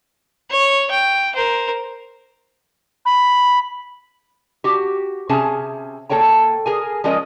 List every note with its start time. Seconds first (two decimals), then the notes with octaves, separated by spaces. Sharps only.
0.50 C#5
0.90 G5
1.35 A#4 C5
3.05 B5
4.64 F#4 G4
5.29 C3 C#4 G#4 A5
6.09 A#3 A4 C#5 G5 A#5
6.66 G#4 A#4 G#5
7.04 F3 G#3 C#4 A#4 D5 D#5